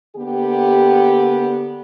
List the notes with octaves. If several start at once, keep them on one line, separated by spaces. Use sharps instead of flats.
D3 A#3 B3 G4